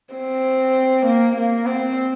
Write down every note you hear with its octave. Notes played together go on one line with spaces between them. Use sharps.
C4
A#3
A#3
C4